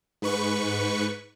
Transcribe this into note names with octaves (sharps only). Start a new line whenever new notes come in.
G#2 B4 C#6